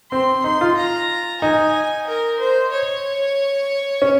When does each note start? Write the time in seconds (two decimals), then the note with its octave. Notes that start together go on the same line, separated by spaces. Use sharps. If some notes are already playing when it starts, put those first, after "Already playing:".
0.11 C4 C6
0.44 D#4 C6
0.61 F4
0.77 A#5
1.42 D#4 G#5
2.07 A#4
2.40 C5
2.72 C#5
4.02 C#4